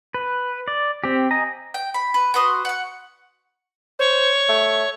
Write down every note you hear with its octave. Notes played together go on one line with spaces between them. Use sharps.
B4
D5
C4 G4
D#5 G#5 A#5
G5
B5
B4
F#4 B4 C6 D#6
F#5 C#6
C5 C#5
A3